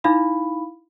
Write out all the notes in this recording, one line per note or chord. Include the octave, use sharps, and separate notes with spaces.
D#4 E4 F5 B5